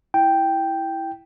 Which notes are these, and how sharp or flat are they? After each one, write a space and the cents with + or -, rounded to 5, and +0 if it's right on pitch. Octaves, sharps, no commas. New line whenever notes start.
E4 +0 G5 +0